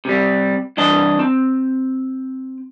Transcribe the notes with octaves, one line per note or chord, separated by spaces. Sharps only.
C3 G3
C2 E3 D4 D#5 A5
C4